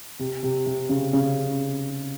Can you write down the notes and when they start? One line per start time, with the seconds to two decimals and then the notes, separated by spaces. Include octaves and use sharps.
0.19 C3
0.43 C3
0.66 C3
0.89 C#3
1.13 C#3